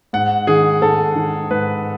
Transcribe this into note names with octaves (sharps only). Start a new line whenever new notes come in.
G#2 F#5
D#3 G#4
G#2 A4
D#3
G#2 B4